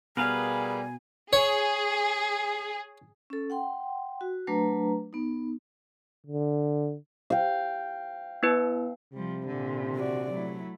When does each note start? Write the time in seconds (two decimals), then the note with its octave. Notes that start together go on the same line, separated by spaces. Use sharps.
0.17 B2 G3 G#4 A#4 B4 F5 G#5
1.33 G#4 C#5
3.30 C#4 A4
3.50 F#5 G5 C6
4.21 F#4
4.47 F#3 A3 D4 B4 A#5
5.13 B3 D#4
6.27 D3
7.30 F5 G5
8.43 B3 E4 B4
9.14 C3 F3 G3
9.47 A#2 D3
9.96 F#4 D5
10.33 F#3 A3 E4